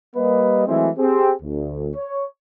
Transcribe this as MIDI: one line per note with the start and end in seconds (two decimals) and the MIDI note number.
0.16 0.65 55
0.16 0.65 58
0.16 0.65 71
0.16 0.65 75
0.67 0.89 52
0.67 0.89 54
0.67 0.89 56
0.67 0.89 57
0.67 0.89 60
0.67 0.89 64
0.97 1.33 60
0.97 1.33 67
0.97 1.33 68
1.42 1.90 38
1.96 2.25 73